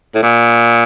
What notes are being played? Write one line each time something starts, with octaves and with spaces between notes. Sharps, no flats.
A2
A#2